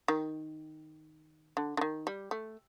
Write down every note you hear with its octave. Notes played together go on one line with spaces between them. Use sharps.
D#3
D3
D3
D#3
G3
A3